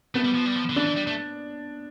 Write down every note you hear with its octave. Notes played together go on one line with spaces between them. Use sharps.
A3 B3
G3
F3
G3
F3
D3
E3 D4
E3
G3
A3